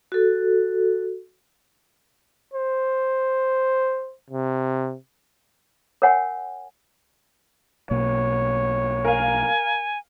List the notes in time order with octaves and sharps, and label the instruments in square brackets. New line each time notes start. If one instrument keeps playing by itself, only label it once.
[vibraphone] F#4 A4
[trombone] C5
C3
[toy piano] A#4 C#5 F#5 G#5
[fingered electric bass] B1 B2 A#3 [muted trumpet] C#5
[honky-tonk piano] A#4 F5 [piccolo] G#5